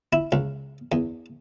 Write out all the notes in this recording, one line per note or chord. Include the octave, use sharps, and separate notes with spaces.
E4
C#2
E2